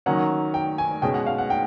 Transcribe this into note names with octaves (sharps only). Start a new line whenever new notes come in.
D#3 F#3 A#3 C#4 F#5
G5
G#5
B2 G#3 C#4 G5
F#5
F5
F#5
G5